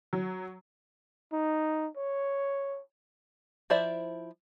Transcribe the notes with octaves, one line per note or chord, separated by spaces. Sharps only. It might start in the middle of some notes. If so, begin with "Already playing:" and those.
F#3
D#4
C#5
F3 E4 C5 D5 E5